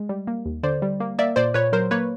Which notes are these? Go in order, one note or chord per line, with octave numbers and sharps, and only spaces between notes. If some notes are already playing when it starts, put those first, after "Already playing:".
Already playing: G#3
G3
A#3
D#2
D3 C5 D5
G3
A#3
A#3 D5 E5
A#2 C5 D5
A#2 B4 C#5
F#3 A#4 C5
A#3 B4 C#5